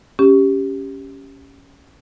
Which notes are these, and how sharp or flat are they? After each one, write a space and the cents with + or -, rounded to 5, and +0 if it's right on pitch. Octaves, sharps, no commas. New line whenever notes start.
C#4 +0 G4 +0